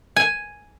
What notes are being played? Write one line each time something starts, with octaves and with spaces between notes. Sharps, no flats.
G#5